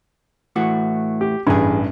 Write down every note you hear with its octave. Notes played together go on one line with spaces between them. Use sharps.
A2 E3 F#4
G4
A1 G2 E3 G#4